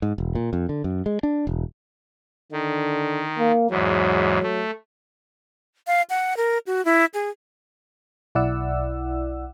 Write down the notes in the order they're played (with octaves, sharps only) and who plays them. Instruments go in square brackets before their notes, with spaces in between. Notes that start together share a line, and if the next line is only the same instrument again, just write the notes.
[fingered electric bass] G#2
E1
A#2
F2
D3
F#2
G#3
D4
E1
[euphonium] D3 [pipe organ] D#3
[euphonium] A#3
[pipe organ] E2 G#2 [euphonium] F#3
[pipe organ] A3
[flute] F5
F#5
A#4
F#4
E4
G#4
[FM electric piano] B1 E4 D5 F#5 E6